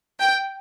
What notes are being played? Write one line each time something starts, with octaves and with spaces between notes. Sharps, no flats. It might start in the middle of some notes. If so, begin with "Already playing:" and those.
G5